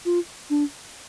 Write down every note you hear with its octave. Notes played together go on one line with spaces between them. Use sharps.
F4
D4